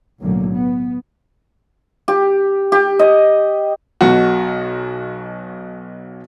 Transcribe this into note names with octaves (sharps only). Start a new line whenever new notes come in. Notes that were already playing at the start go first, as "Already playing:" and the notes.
B1 A2 D3 F#3 A#3
B3
G4
G4
D#5
B1 B2 F#4